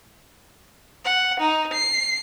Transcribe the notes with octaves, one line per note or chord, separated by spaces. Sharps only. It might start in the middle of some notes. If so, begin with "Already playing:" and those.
F#5
D#4
C7